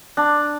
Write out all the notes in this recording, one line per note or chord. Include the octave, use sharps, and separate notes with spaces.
D4